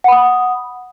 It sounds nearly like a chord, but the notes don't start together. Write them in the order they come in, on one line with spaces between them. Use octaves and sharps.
F#5 B5 D#6